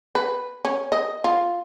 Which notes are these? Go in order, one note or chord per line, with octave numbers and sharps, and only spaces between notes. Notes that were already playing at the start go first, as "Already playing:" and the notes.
B4
C#4
D#5
F4